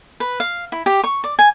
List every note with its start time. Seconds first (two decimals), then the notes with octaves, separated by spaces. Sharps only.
0.20 B4
0.40 F5
0.72 E4
0.86 G4
1.04 C#6
1.24 D5
1.39 G#5